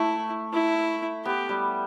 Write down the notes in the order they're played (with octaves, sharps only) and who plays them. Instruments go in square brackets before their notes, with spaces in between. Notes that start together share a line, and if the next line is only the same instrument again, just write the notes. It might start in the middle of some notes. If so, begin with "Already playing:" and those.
Already playing: [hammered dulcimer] A3 [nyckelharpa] E4
[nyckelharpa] E4
[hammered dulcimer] B3 [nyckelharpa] G4
[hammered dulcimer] G3